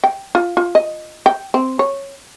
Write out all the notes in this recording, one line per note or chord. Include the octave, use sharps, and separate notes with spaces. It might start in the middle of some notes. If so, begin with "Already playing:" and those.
G5
F4
F4
D#5
G5
C4
C#5